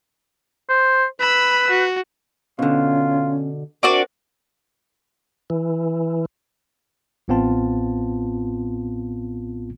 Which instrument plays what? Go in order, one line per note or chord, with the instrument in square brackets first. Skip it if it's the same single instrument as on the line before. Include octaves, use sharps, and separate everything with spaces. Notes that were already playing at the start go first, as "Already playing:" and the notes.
[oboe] C5
[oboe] B4 [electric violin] B5 E6
[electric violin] F#4
[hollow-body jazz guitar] B2 D3 [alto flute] C#4 [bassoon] F4
[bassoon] C4 [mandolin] D4 F#4 D5 [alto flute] A#4
[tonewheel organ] E3
[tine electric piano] A1 A2 B3 C4 F4 A5